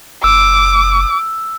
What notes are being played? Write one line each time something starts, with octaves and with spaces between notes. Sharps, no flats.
F#1 D6 E6